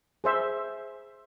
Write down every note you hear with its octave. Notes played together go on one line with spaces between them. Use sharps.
G#4 C5 E5